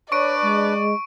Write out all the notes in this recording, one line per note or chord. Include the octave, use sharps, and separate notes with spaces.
D4 B4 C#5 D5 C#6 D7
G#3